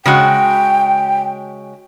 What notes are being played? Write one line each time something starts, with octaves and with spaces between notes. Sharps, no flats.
C#3 G#3 F#4 G5